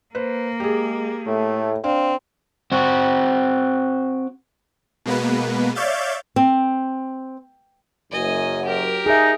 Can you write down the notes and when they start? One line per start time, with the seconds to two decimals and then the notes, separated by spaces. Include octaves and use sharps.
0.15 A#3 B4 C5
0.60 G#3 G4 G#4
1.27 A2 A3
1.84 C4 D4 F5
2.72 C4 F#4
5.06 B2 G#3 A#3 B3 B4
5.75 C#5 D5 E5 F5 G6 A6
6.36 C4
8.12 F#1 F#2 D#5 G#5
8.65 G4 A#4
9.06 D#4 G#4 E5